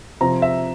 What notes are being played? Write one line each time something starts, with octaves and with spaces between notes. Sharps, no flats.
C3 F3 C4 A#5
E5